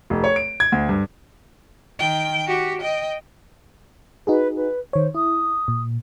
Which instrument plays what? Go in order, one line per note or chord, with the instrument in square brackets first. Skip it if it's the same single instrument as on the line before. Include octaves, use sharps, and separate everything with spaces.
[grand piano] F1
C#5
D7
G#6
D2
G2
[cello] D#3 G5
F#4 G4
D#5 G5
[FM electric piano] D#4 F#4 G#4 [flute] B4
[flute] B4
[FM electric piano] D#3 C#5 [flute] C5
[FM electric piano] E4 [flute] D#6
[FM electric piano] A#2